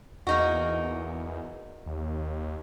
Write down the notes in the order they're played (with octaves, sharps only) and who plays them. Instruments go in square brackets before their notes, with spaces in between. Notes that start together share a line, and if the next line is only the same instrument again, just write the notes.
[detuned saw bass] E2 [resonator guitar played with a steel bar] A#3 D#4 F#4
[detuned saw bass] D#2